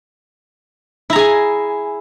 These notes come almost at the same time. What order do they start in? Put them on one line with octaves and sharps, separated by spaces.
E4 A#5 G#4 G#5